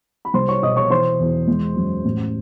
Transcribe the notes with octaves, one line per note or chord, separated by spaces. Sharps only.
B5
C2 C5 C6
C#5 C#6
B2 D#5 D#6
C#5 C#6
E3 C5 C6
E2
G#3
F#2
A1